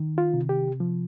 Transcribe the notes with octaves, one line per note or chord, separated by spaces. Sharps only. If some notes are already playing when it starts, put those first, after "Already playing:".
Already playing: D#3
F4
C3
G4
F3